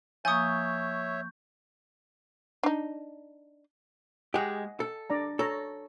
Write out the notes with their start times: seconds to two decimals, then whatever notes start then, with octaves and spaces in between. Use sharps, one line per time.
0.25 F3 A#3 C#5 E5 G#5 C#6 D#6 G6
2.63 D4 D#4
4.34 G#3 G4 D#5 F#5 G#5
4.80 A4
5.10 D4 D5 A#5
5.39 A4 C#5 A#5